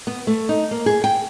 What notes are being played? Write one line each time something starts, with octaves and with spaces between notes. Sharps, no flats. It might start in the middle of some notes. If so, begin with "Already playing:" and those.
B3
A3
D#4
A#3
G#4
G5